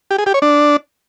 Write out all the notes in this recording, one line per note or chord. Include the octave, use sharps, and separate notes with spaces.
G4
G#4
G4
C#5
D4